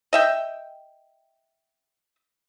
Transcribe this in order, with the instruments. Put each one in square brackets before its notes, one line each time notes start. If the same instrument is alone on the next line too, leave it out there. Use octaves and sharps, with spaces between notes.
[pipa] D#5 E5 G5